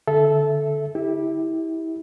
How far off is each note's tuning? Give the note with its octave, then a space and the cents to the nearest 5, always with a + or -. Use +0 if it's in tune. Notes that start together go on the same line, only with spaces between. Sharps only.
D3 -5 A4 -15 E5 +0
E4 -25 G4 +5